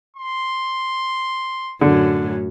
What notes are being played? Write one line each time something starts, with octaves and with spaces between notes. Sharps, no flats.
C6
F#2 A2 D3 F#3